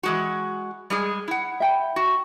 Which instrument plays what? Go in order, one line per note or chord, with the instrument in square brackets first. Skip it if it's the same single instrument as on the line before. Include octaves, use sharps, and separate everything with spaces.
[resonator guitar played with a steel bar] E3 G#3 F#4
G3 G#3 G#4
E4 F#5
[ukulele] E5 G5 B5
[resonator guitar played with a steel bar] F#4